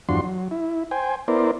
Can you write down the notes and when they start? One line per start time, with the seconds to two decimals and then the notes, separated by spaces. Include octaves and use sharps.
0.09 E2 G2 F3 D4 F#4 C6
0.24 F#3
0.51 E4
0.91 C5 G5 G#5
1.28 B3 E4 A#4 C5 D5